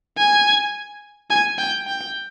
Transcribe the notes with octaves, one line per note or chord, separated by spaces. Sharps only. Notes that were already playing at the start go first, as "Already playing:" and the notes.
G#5
G#5
G5
G5